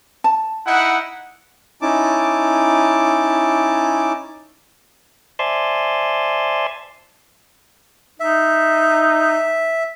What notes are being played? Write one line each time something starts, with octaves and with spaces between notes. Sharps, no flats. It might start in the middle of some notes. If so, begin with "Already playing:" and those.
A5
D#4 E4 F#5
C#4 D#4 E4 A5 D6
C5 D5 E5 G#5 A5 C6
D#4 E5